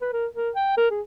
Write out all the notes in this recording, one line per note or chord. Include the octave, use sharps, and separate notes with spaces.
B4
A#4
A#4
G5
A#4
G#4